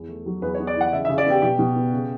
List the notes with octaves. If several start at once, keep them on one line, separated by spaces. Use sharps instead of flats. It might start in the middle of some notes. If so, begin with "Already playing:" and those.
Already playing: E2
A3
F#3
E2 B4
C#5
B3
D5
E3 F#5
C#3 E5
C#3 E5
D5
B3 G4
B2 G4
B2
B3
C#3